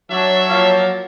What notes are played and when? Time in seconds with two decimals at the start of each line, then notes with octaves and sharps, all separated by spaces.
0.10 F#3 D4 C#5 E5 A5
0.49 F3 A#3 F4